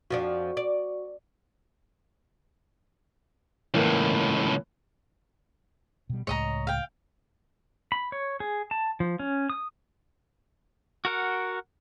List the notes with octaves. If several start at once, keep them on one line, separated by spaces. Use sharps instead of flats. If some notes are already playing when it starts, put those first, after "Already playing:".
F2 F3 D4 F#4
D5
C#2 A2 E3 A#3
B2 G3
C#2 A2 G#3 C#5 D#5 A#5
F5 G5
B5
C#5
G#4
A5
F3
C#4
D#6
F#4 A#4 F#5